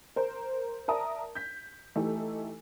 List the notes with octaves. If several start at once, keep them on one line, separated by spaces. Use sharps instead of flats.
A#4 C5
A#4 D5 E5 A5 A#5 D#6
G6 B6
E3 A3 D#4 G4 A4